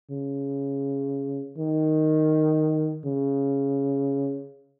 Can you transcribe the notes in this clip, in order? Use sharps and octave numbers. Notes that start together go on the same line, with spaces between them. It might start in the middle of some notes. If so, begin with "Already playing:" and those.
C#3
D#3
C#3